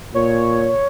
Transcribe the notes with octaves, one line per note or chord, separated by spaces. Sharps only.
A#2 C#5